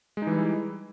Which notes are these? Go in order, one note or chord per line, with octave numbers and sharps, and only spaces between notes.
E3 G3 G#3 D#4 E4